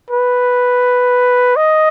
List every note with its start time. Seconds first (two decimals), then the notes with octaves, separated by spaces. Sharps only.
0.10 B4
1.56 D#5